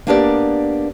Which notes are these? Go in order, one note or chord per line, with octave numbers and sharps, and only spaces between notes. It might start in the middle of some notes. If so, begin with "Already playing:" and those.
A#3 B3 D4 G4 A#4 D5